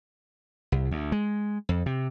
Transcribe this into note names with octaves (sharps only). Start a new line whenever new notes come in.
C2
D2
G#3
F2
C3